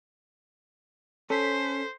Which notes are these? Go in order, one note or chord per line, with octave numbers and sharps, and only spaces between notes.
C#4 A4 C5 B6